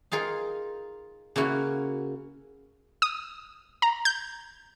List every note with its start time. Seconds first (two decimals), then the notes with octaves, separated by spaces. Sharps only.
0.12 D#4 F4 G#4 A#4
1.36 C#3 A#3 E4 F#4
3.02 D#6
3.82 A#5
4.05 G6